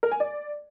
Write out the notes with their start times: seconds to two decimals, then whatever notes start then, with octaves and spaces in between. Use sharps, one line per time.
0.03 A#4
0.11 G#5
0.20 D5